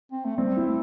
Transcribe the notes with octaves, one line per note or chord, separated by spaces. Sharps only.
C4
A3
G3 C4
E4
A3